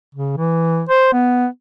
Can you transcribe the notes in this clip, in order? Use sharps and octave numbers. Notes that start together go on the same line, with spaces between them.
C#3
E3
C5
B3